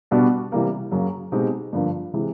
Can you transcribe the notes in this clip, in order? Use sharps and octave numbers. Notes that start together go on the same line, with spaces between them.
B2 G3 B3 D4 F#4
C3 E3 G3 A#3
F#2 C#3 F#3 A#3
B2 G#3 C4 D#4 G4
G2 D3 F3 A#3
C3 E3 G#3